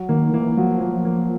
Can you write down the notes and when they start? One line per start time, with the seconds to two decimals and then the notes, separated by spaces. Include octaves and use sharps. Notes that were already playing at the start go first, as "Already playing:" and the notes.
Already playing: F#3
0.09 D#3 A#3
0.33 E3 A#3
0.57 F3 F#3
0.80 A#3
1.05 A#3